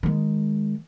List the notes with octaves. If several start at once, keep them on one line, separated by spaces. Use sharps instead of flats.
D#3 G#3